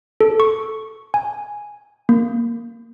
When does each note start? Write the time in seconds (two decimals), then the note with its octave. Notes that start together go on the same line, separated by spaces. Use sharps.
0.21 A4
0.40 C#6
1.14 G#5
2.09 A#3